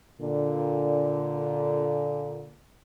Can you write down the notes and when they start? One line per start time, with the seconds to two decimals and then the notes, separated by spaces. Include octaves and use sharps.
0.21 A#2 D3